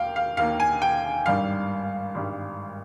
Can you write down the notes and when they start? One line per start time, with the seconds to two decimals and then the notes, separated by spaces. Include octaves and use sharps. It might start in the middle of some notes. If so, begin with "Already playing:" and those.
Already playing: D#2 A#3 F5 G5
0.16 F5
0.37 D#2 D#3 A#3 F5
0.60 G#5
0.82 G5
1.26 G#1 G2 G3 F5
2.15 G#1 G2 G3